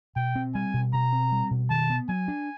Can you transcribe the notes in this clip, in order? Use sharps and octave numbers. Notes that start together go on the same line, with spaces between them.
B2 G5
C4
G3 G#5
B2
B2 A#5
C4
G3
B2
D#3 A5
B3
F#3 G#5
D4